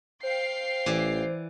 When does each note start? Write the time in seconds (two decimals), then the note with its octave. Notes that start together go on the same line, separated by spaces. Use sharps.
0.23 C5 F5 G5 C7
0.86 A1 E3 D5 E5